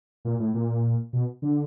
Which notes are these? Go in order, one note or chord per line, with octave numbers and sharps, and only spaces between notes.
A#2
A2
A#2
B2
D3